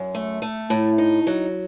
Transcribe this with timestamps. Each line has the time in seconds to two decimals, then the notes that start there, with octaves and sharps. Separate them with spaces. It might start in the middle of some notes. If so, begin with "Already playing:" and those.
Already playing: F#2
0.15 A3
0.42 A3
0.70 A2
0.98 D#4
1.27 F#3